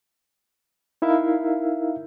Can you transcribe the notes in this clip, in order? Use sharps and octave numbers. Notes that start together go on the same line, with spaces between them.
D#4 E4 A#4 E5 F5